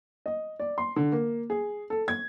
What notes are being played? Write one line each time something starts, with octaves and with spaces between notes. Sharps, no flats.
D#5
D5
C6
D3
A#3
G#4
A4
G#6